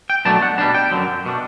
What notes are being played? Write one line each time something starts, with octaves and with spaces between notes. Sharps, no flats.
G5
B2 F#3 A3 D4 A5
F#5
B2 G3 D4 A5
G5
F#2 D3 F#3
B2 A3 D4